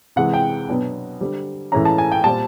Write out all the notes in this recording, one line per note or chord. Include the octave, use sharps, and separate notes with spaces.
C3 E3 G#3 F#5
G5
B2 F#3 B3 D4
D3 G3 C4
A2 E3 G#3 C#4 A#5
A5
G#5
G5
A#2 G3 C4 A5